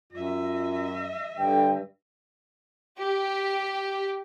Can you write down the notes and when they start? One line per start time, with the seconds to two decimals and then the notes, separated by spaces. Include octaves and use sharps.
0.13 F#2 F4 D#5 E5
1.37 G2 D3 G5
2.97 G4